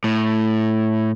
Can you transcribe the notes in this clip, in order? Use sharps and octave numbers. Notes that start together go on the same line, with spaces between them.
A2